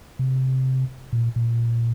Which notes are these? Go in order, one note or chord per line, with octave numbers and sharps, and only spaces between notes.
C3
A#2
A#2